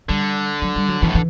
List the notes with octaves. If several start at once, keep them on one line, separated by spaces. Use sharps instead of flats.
D3 G3
F#3
G3
F#3
B2 E3
A2
E3